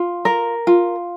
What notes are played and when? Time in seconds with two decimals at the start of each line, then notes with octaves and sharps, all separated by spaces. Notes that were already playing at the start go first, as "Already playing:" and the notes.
Already playing: F4
0.25 A#4
0.67 F4